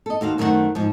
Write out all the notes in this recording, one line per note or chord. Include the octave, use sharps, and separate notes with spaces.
A4 D#5
D#2 F#4 C5 F5
F#2 D#3 A3 A#4 C5 F#5
G#2 F3